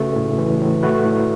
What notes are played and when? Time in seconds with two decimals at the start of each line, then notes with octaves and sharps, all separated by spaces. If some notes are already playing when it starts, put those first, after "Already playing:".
Already playing: C#3 A3 F#4 B4
0.16 A2
0.38 E3
0.61 A2
0.83 A3 F#4 B4
1.05 A2